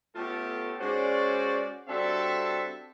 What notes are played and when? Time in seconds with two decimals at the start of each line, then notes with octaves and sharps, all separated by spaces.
0.15 A3 B3 C#4 F4 G4 A4
0.81 G#3 C#4 F#4 C5 D5
1.88 G3 C4 D4 F#4 A4 E5